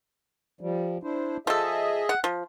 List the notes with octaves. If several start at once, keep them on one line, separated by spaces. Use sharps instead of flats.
F3 G3
D4 E4 C5
F3 G#4 A4 D#5 E5
F#5
F3